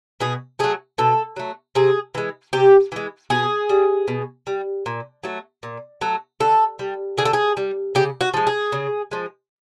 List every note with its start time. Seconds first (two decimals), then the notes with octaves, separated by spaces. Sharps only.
0.20 B2 G#4
0.59 F#3 A3 G#4
0.98 B2 A4
1.36 F#3 A3
1.75 C3 G#4
2.15 E3 G#3
2.53 C3 G4
2.92 E3 G#3
3.30 B2 G#4
3.69 G3
4.08 B2
4.47 G3
4.86 A#2
5.24 F#3 A3
5.63 A#2
6.01 F#3 A3
6.40 D3 A4
6.79 G3
7.18 D3 G#4
7.25 A4
7.33 G#4
7.57 G3
7.95 C#3 G4
8.21 F#4
8.34 F3 G#3
8.47 G#4
8.72 C#3
9.11 F3 G#3